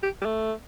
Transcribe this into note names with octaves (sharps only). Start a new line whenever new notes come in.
G4
G3
A3